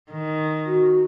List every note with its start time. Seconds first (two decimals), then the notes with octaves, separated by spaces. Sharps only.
0.10 D#3
0.65 F#4